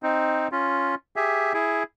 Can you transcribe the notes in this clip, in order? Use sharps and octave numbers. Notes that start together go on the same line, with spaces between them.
C4 D#4
C#4 F4
G4 G#4 E5
E4 G#4